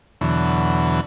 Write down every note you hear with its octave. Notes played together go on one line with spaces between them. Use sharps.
E2 B2 D3 E3 F#3